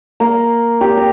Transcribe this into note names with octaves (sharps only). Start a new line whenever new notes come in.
A#3
G4
A#5